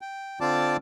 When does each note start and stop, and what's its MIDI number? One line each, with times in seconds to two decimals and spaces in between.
0.01 0.39 79
0.41 0.77 50
0.41 0.77 60
0.41 0.77 65
0.41 0.77 74
0.41 0.77 81
0.41 0.77 86